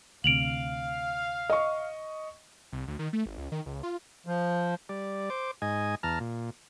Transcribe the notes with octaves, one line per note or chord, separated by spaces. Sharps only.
D2 C3 F5 D7 F7 F#7
D#5 C#6
C2
D2
D#3
A3
G#1
C#2
D#3
C#2
F4
F3
G3 D5
C5 D6
G#2 D#5 G#5
E2 A5 A#5 F6
A#2